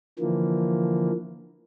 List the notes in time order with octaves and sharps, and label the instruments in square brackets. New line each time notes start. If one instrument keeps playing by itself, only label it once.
[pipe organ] D3 E3 F3 A#3